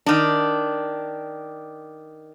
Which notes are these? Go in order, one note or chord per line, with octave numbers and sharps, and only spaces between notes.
D#3 D4